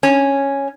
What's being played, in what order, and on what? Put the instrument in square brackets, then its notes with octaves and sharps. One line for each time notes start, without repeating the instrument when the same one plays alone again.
[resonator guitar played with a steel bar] C#4